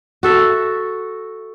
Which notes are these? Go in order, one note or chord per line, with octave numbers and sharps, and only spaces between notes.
F#4 A4 E5